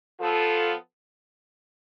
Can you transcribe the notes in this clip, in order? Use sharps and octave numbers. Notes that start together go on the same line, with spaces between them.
F3 B3 F4 A4